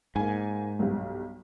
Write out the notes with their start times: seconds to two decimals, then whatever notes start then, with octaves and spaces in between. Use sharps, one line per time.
0.16 G#2 A#3 G#5
0.79 B1 G2